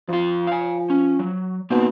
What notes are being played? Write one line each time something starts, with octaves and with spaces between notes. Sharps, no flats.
F2 F3 F4
F5 G#5
C#4
F#3
B2 A#3 C4 D#4